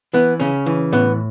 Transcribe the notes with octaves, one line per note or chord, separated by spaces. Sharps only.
E3 B3
C#3 C#4
E3
A2 B3